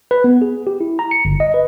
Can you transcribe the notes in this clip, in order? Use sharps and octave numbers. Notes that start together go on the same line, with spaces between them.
B4
B3
G#4
G4
E4
A#5
C#7
G1
D#5
B4